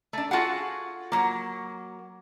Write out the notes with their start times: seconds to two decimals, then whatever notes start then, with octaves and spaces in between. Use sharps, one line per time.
0.13 A3 D4
0.31 F4 F#4 G#4 A4 F5 F#5
1.12 F#3 A#3